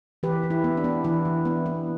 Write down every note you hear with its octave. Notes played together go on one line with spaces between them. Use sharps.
E3 G4 B4
E3
E4
B3
D4
B3
E3 E4
E3
B3
B3